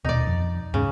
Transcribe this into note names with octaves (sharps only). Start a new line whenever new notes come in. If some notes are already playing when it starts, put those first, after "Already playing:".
D#1 B2 D#4 D5
F2
E2 G#2 C#3 G#3